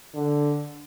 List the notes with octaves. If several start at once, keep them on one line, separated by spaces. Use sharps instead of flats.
D3